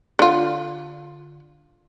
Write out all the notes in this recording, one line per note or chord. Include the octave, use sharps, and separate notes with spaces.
D3 F4